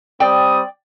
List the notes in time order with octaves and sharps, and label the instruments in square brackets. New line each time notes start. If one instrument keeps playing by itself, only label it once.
[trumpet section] G3 C4 D#6 [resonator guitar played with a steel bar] D5 G5